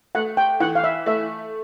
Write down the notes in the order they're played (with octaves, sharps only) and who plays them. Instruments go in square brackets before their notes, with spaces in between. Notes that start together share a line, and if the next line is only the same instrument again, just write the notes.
[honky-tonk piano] A3 [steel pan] F#5
[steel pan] G5
[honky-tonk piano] E3 [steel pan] F#5
[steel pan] F5
E5
[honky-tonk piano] A3 [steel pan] E5